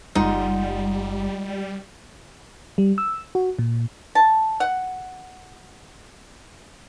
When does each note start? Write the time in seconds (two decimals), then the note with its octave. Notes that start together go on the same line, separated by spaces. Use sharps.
0.15 F#1 F#2 G3 G#3 D#4 F4 F#5
2.78 G3
2.98 E6
3.35 F#4
3.59 A#2
4.15 A5
4.60 F#5